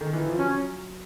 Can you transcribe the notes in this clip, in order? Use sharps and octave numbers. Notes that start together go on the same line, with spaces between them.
D#3
E3
F3
F#3 C#4